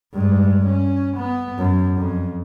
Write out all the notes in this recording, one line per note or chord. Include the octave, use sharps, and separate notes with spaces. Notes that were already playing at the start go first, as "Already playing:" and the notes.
G2 G#3
C#4
B3
F#2
F2